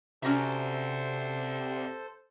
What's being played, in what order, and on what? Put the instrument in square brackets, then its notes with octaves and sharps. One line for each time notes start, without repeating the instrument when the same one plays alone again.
[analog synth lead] C3 [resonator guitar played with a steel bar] C#4 F#4 A#5 [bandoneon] A4 C5 [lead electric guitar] D5 E5